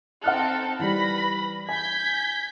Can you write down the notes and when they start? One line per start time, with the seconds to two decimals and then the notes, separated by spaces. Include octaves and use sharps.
0.24 C4 D#4 A4 F#5 F6 F#6
0.79 E3 G3 B4 B5 A#6
1.69 G#5 G6 G#6 B6